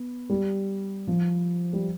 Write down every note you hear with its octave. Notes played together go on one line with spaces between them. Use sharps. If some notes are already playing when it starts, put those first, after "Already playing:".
Already playing: B3
G3
F3
G3